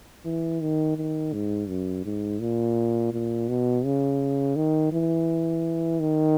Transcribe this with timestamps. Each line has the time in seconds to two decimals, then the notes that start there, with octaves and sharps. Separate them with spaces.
0.25 E3
0.61 D#3
0.97 D#3
1.33 G#2
1.68 F#2
2.05 G#2
2.41 A#2
3.13 A#2
3.49 B2
3.85 C#3
4.56 D#3
4.93 E3
6.00 D#3